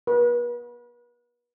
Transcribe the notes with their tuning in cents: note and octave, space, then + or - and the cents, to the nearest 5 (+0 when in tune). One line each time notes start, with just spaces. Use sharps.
B4 -40